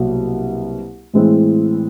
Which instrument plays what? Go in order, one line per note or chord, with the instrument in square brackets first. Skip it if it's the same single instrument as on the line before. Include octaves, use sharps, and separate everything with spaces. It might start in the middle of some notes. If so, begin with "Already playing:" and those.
Already playing: [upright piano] C2 B2 F#3 A#3
A2 E3 G#3 C4 E4